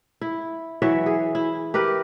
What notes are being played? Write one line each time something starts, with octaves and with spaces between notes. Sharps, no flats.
E4
E3 F#3 C#5 E5
G#4
E4
G4 A#4 B4